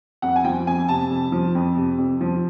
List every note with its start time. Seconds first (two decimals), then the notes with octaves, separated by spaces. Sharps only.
0.22 F2 F#5
0.36 G#5
0.44 F3 G5
0.67 F2 G#5
0.88 C3 A5
1.10 F2
1.32 F3
1.55 F2
1.76 C3
1.98 F2
2.21 F3